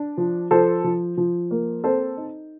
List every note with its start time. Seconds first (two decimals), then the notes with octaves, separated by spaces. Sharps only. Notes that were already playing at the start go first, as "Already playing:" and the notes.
Already playing: D4
0.17 F3
0.51 F3 A4 C5
0.84 F3
1.17 F3
1.51 A#3
1.84 C4 A4 C5
2.17 D#4